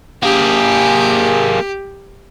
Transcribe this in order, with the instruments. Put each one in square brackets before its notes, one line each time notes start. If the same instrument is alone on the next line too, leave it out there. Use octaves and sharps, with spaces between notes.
[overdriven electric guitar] A#3 G#4 [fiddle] G4